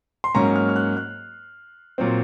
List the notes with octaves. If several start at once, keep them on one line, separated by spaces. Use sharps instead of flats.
C6
G#2 F#3 A#3 C#4 A#5
F6
F6
F#6
F#6
A#2 F#3 C4